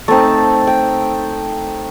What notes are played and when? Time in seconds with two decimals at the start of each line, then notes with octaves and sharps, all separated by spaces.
0.08 A3 C4 D#4 A5
0.67 G5